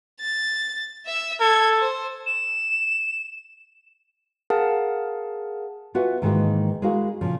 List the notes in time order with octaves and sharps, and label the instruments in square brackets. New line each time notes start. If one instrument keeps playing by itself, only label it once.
[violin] A6
E5 E6
[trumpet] A4 [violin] G#6
[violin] C5
[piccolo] E7
[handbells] G#4 A#4 F5 F#5 A5
[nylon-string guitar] F4 F#4 B4 E5 F#5 G#5
G#2 D#3 E3 G#3 A#3 D#4
G#3 E4 F#4 G#4 A#4 F5
A#2 C#3 F3